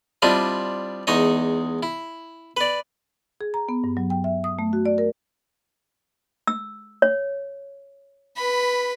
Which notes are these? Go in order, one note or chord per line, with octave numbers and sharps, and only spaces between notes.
G3 C4 D4 E4 F4 D#5
E2 G#3 D#4 C#5 D#5
E4
B4 D5
G#4
A#5
B3
G2
F#3
G5
E5
D#6
A3
F#4
D5
A#4
E6
C#5
B4 B5